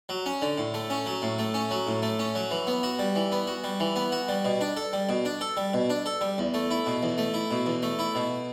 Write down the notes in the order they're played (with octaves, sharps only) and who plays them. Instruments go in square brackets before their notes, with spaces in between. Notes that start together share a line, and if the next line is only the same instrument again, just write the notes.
[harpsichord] F#3
C#4
D3
A2
A3
C#4
F#3
A2
A3
C#4
F#3
A2
A3
C#4
F#3
E3
B3
F#4
G3
E3
B3
F#4
G3
E3
B3
F#4
G3
B2
D4
A4
G3
B2
D4
A4
G3
B2
D4
A4
G3
E2
A3
E4
B2
E2
A3
E4
B2
E2
A3
E4
B2